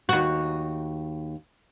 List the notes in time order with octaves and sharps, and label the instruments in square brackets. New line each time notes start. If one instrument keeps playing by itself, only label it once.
[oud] D#2 F#4